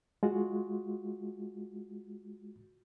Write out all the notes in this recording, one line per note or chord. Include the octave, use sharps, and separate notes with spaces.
G#3 F4 F#4